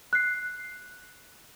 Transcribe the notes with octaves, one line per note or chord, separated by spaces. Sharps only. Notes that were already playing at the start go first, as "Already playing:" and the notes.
F#6 C7